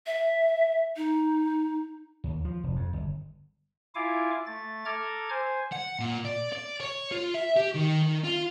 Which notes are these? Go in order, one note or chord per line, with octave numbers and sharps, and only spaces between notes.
E5
D#4
D#2
F3
F1
F2
G1
E4 F4 F5 G#5 D6
A3 A6
A4 A#5 D6 F6 G#6
C5 G#5
F#5
A#2
D5
D5
C#5
F4
E5
G4
D#3
D#3
F4